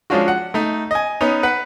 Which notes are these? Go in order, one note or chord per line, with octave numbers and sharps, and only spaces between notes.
F3 G#3 C#4 D4 F4 F#4
F#5
A3 D#4
D#5 G#5
B3 C#4 D#4
B4 F#5